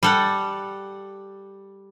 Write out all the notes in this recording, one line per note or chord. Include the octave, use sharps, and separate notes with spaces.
G3 A4 F#5